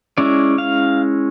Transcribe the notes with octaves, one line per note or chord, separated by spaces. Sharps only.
G#3 C#4 E4 D5
F5